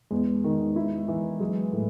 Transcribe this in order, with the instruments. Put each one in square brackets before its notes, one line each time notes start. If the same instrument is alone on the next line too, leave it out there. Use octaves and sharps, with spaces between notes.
[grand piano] E2 [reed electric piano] G#3
[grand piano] D#3
E4
E3
[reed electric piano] F#3 [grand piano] G#3
[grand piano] A2